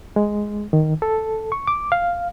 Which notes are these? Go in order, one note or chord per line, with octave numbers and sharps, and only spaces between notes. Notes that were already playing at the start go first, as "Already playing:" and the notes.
G#3
D#3
A4
C#6
D6
F5